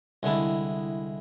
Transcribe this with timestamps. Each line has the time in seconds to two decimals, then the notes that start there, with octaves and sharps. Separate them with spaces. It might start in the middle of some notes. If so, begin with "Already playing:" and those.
0.23 C2 D3 G#3 E4 A5